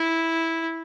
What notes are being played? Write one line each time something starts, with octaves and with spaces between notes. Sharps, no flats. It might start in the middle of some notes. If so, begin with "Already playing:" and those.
Already playing: E4